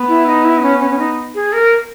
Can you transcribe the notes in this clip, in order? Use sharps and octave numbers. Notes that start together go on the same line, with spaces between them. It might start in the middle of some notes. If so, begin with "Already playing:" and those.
Already playing: B3
E4
D#4
E4
D#4
C#4
C#4
C#4
D#4
G#4
A#4